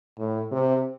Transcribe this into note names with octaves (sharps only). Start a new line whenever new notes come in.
A2
C3